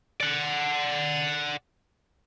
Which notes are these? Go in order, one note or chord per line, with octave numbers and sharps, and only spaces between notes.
D5 F#5